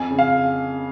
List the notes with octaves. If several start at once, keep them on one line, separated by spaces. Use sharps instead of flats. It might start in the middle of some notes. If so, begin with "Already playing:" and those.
Already playing: F2 G#5
C#3
F5